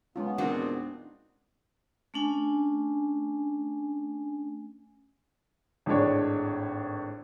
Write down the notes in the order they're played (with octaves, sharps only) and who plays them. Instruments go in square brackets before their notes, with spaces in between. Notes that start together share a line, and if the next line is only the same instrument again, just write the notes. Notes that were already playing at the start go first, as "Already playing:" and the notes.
[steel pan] G#3 C#4 F4 [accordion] B3
[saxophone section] E2 A#2 C4 [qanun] D4 D#4 F#4
[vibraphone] A3 C#4 D4 G#5
[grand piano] G#1 A2 G#3 D4 C#5